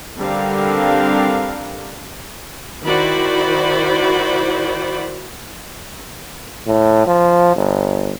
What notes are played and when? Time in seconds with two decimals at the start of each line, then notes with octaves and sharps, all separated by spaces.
0.18 D3 G3 C4 D4 A#4 F5
2.83 D#3 E4 F#4 C5 D5 B5
6.67 A2
7.07 F3
7.56 G1